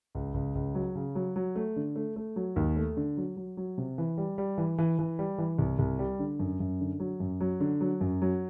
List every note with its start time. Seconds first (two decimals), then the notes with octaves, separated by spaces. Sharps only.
0.15 C#2
0.34 C#2
0.55 C#2
0.75 F#3
0.95 C#3
1.15 F#3
1.36 F#3
1.56 A3
1.76 D3
1.96 A3
2.16 A3
2.36 F#3
2.56 D#2
2.76 A3
2.97 D3
3.17 F#3
3.37 F#3
3.57 F#3
3.78 C3
3.98 E3
4.18 G3
4.38 G3
4.58 E3
4.78 E3
4.99 E3
5.19 G3
5.38 E3
5.59 C2
5.79 C2
5.99 G3
6.19 D3
6.39 F#2
6.60 F#2
6.80 D3
7.00 F#3
7.20 F#2
7.41 F#3
7.60 D3
7.81 F#3
8.01 F#2
8.22 F#3